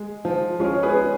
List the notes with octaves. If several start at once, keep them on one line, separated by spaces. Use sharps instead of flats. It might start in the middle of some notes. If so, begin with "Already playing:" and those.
Already playing: G#3
F3
G#3 C#4 F4
C#5
G#4 B4
C#4